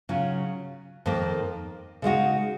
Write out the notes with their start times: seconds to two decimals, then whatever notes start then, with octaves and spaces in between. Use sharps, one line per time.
0.09 C#3 F#3 C#4 F4
1.06 F2 D#3 A#3
2.02 C#3 G#3 D#4 F#4